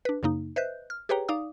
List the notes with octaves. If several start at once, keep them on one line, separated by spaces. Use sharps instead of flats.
D4 B4
F#2 C#3 A#3 D#4
B4 C5 D#5 E5 F#6 G6
F6
G4 G#4 B4 C#5 G5 A#5
D#4 D5 F5 D6 D#6